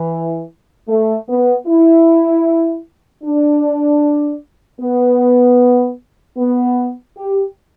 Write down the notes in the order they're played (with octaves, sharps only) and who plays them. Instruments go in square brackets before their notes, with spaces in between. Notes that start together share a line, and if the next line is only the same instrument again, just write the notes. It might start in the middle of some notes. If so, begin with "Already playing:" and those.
Already playing: [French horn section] E3
A3
B3
E4
D4
B3
B3
G4